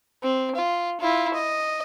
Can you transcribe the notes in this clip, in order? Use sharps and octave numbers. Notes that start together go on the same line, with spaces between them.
C4
F4
E4 F4
D#5